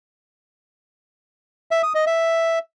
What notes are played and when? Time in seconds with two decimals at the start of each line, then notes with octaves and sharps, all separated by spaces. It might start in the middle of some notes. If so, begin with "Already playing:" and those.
1.71 E5
1.83 D#6
1.95 D#5
2.07 E5